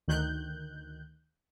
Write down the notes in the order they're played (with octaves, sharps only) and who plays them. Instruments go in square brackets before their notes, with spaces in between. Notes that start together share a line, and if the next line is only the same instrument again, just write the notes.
[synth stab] D2 D#3 F#6 G6